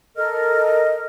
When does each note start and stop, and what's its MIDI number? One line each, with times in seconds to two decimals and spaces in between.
0.16 1.06 69
0.16 1.06 70
0.16 1.06 75
0.16 1.06 89